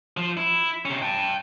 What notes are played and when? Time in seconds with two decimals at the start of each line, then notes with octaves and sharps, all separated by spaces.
0.17 F3
0.37 E4
0.85 C3 C#4
1.02 G5 A5